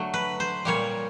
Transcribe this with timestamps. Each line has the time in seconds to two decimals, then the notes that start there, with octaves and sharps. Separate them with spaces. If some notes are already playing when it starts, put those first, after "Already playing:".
Already playing: D3 F#3 A3
0.14 B4
0.40 C5
0.65 A#2 G3 A#3 C#5